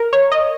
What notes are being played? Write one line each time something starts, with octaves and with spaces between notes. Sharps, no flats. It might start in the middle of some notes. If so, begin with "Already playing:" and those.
Already playing: A#4
C#5
D#5